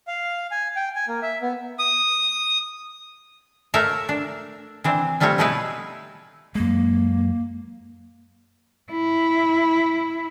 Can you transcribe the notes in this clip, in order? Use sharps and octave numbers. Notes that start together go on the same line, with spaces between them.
F5
G#5
G5
G#5
A#3
E5
B3
D#6
A3 A#4 C#5 E5 F5
D4
E3 C4 D4
F3 G3 A3 C4 C#5
B2 A3 D#4 E4 G#4 B4
F#2 G#3 A#3
E4